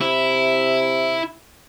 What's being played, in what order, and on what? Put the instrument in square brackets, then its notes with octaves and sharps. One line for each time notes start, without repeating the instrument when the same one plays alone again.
[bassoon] C3 [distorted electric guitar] E4